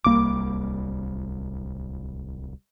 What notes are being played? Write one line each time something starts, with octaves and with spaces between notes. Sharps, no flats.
D1 C2 G3 A#3 D6